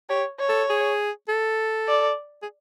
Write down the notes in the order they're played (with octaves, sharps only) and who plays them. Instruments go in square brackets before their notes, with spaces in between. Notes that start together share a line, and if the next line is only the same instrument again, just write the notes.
[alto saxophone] G4 [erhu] C#5
[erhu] C#5
[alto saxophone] A4
G#4
A4
[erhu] D5
[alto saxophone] G#4